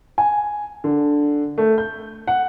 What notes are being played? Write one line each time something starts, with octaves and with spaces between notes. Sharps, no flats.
G#5
D3
A3
G6
F#5